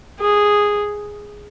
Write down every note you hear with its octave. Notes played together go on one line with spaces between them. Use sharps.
G#4